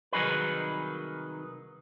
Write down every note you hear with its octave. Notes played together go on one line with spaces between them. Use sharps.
C2 D#3 F#3 D#4 G#4 B4